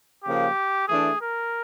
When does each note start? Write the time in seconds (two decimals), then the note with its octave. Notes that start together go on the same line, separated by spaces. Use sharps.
0.23 C#3 F3 A#3 G4
0.88 E3 A3 D4 G#4
1.20 A#4